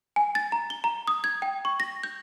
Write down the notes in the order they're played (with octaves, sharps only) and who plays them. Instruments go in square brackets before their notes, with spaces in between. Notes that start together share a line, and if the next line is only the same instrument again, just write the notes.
[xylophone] G#5
A6
A#5
G7
A#5
D#6
G#6
G5
C#6
A#6
G6